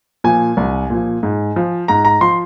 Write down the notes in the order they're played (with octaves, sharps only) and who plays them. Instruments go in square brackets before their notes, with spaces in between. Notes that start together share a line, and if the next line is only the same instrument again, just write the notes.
[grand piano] A#2 F3 G#5
C2
A#2 F3
G#2
F3
G#2 A#5
A#5
F3 C6